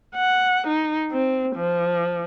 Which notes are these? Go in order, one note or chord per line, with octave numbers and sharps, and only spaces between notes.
F#5
D#4
C4
F3